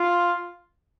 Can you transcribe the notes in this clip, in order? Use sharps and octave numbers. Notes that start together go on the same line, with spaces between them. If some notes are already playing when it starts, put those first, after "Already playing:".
Already playing: F4